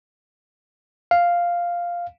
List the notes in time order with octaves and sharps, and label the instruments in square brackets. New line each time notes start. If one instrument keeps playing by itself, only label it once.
[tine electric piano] F5